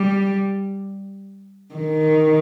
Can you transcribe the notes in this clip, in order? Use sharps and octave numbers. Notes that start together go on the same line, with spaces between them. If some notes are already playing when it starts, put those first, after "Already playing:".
Already playing: G3
D#3